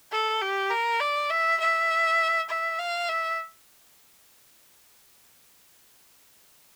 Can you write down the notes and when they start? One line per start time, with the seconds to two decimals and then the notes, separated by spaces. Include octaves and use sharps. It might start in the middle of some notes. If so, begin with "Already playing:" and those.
0.12 A4
0.41 G4
0.70 A#4
1.00 D5
1.30 E5
1.60 E5
2.49 E5
2.79 F5
3.09 E5